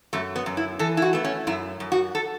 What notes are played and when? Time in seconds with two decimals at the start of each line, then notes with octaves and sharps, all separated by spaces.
0.13 F#2 A3
0.36 B3
0.46 F#2
0.57 E4
0.79 E3 A4
0.97 E4
1.02 F#4
1.13 A3 B3
1.25 C#4
1.47 F#2 E4
1.80 F#2
1.92 F#4
2.15 A4